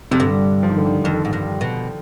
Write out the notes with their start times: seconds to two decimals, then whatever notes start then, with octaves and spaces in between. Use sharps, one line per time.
0.11 F2 C3
0.20 G2 D3
0.63 F3
0.69 D#3
0.78 D3
0.85 D#3
1.04 F2 D#3
1.25 G#2
1.33 G2
1.61 B2